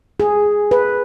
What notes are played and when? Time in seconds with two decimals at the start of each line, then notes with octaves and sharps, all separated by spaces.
0.20 G#4
0.71 B4